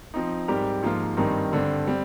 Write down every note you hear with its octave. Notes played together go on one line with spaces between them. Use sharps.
F3 C4 D#4
G#2 G3 C4 G4 A#4
G#2 F3 A#3 F4
G2 D#3 G3 C4 D#4
G2 D3 G3 C4
G3 C4